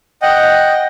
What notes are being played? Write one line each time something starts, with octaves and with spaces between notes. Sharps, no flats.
D#5 F#5 G5